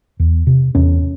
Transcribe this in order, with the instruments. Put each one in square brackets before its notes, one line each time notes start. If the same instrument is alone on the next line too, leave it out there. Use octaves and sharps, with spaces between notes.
[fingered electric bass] E2
C3
E2 C#4